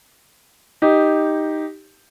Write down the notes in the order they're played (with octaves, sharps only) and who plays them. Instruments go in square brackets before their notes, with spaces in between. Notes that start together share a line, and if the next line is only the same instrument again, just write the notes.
[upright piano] D#4 G4